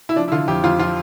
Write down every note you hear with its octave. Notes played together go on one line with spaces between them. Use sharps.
E4
F3 D4
E4
D3 F4
F2 G4
F2 F4
F3 F4